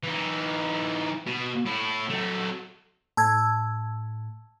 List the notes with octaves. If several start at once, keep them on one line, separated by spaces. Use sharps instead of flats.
E3 D#4
B2
A2 E4
F#3 A3
A2 A5 E6 G#6